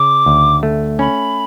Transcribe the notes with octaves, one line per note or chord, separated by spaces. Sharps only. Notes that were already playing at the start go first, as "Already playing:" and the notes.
Already playing: C#3 D6
D2
A3
C#4 B5